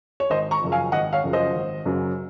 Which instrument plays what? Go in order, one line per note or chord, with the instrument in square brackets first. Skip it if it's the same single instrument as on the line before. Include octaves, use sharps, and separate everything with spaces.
[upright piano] C#5
G#1 C5 D#5
A#5 C#6
F#2 C#3 F3
F5 G#5
G#1 D#5 F#5
C#5 F5
F#2 C#3 F3
C5 D#5
G#1
F#2 C#3 F#3